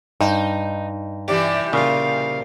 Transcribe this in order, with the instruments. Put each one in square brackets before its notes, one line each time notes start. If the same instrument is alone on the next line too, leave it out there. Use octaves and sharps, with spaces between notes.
[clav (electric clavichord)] G2 [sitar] D#4
[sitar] C3 E3 G3 [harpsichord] G4 [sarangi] D5
[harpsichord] A#2 F4 [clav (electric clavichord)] C#3 [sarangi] F5